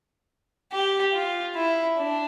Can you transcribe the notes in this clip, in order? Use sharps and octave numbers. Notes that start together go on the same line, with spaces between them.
G4
F4
E4
D4